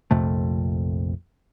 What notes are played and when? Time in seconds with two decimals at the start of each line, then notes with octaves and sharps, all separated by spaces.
0.11 A#1 F2 C3 A3